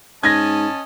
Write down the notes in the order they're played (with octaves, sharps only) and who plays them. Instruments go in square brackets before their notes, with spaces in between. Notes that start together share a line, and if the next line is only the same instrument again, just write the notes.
[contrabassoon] G#2 [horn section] C#4 D#5 A5 [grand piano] G#6 A#6